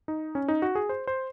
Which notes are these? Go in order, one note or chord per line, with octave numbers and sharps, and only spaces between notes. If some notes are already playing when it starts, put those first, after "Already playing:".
D#4
C#4
D#4
F#4
G#4
C5
C5